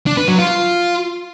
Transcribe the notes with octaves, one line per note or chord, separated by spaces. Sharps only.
D4
B4
F#3
F4